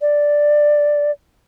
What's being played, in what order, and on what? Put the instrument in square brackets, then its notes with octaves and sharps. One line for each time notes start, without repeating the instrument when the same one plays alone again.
[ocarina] D5